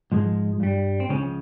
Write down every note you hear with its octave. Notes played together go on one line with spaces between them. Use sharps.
G#2 F3 G#3
G2 G3
C4
C#2 C#3 F3 C#4